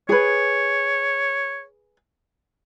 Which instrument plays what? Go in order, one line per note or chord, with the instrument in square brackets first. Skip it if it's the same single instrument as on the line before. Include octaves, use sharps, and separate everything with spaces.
[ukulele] G#4 B4 [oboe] C#5